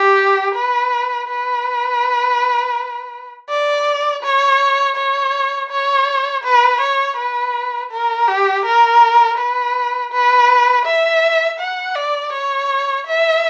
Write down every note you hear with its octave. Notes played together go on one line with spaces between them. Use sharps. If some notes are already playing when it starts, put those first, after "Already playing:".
Already playing: G4
B4
B4
D5
C#5
C#5
C#5
B4
C#5
B4
A#4
G4
A#4
B4
B4
E5
F#5
D5
C#5
E5